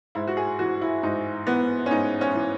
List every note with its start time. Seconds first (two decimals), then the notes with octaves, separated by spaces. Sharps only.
0.15 G#2 E4
0.28 F#4
0.37 G#4
0.59 E3 F#4
0.82 E4
1.03 G#2 D#4
1.47 E3 B3
1.86 C#4
1.91 G#2 D#4
2.21 C#4
2.35 E3